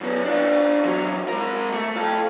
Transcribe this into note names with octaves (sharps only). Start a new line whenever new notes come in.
F#2 B3
D4 F4
E2 F#3
G#3 A#4
A3
F4 A4